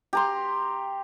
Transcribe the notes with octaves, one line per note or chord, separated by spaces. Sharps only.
G4 A#5 C6